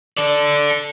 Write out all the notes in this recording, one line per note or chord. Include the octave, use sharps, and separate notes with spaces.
A4 D5